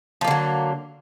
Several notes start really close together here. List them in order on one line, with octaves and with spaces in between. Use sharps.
F3 A#3 D3 F#3